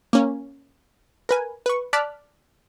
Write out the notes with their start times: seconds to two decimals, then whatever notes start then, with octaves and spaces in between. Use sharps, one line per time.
0.13 A#3 C#4
1.29 A#4 B4 G#5
1.66 B4 C#6
1.93 D5 A5 D6 F6 F#6 B6